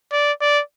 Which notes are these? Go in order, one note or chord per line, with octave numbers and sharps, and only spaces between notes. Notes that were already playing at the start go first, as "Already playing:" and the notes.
D5
D5